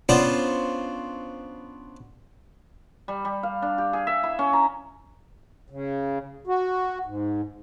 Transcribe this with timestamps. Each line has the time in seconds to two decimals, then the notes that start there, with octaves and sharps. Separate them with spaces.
0.09 B3 C#4 D4 F4 C5
3.08 G3
3.25 G3
3.43 F5
3.62 D4
3.78 G4
3.93 G#4
4.07 E5
4.23 E4
4.39 C#4
4.53 A#5
5.70 C#3
6.47 F#4
7.05 G#2